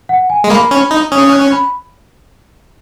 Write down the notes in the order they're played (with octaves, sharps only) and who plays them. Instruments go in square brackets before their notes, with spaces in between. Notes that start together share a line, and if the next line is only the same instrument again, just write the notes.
[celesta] F#5
G#5
[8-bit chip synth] G#3
[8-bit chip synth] A#3 [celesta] B5
[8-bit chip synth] C#4
D#4
[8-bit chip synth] C#4 [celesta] D#6
[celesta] F#6
B5